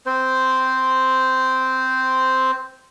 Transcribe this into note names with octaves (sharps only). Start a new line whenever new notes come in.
C4 C5